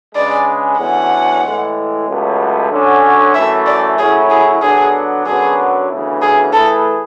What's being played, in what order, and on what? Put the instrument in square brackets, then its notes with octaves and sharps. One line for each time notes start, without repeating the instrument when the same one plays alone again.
[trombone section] C#3 G#3 D4 G#4 B4 [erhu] D5
[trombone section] E2 D3 F#3 A3 C#4 [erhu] F#5
[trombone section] A2 E3 G#3
C#2 B2 F#3 A3
D3 F#3 C#4
[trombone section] F#2 E3 A3 [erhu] E5
[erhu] D5
[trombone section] A2 F#3 C#4 E4 [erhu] G#4
[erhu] G#4
[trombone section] D3 F#3 B3 D4 [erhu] G#4
[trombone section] F#2 D3 F#3 B3 [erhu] G#4
[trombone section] D2 C#3 E3 B3 E4
[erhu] G#4
[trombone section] E3 A3 E4 G#4 B4 [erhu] A4